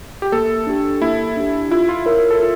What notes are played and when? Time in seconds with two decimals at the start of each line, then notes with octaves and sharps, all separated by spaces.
0.22 G4
0.32 A#3 A4
0.67 D4 G4
1.02 A#3 E4
1.37 D4 G4
1.71 E4 F4
1.89 F4
2.06 E4 A#4 C#5
2.31 A4
2.40 F4